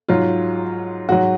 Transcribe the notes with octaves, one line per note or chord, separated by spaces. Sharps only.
G#2 F#3 F4
G#2 F#3 F#4